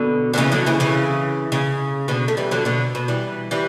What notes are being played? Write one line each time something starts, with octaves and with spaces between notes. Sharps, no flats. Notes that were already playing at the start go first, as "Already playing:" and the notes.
Already playing: B2 D3
D3
C#3 E3
D3 F#3
C#3 E3
C#3 E3
C#3
B2 D3
A3
E3 G3
D3 F#3
B2 D3
B2
E3 G3
E3 G3